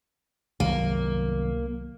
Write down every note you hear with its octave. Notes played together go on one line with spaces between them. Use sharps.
C2 D#3 F#3 A#3